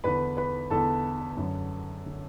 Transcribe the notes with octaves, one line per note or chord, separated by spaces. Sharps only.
E2 D3 B4 B5
B4 B5
E2 D3 A4 A5
F#2 D3
D3